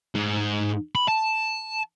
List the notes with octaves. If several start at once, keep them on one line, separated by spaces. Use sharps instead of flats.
G#2
B5
A5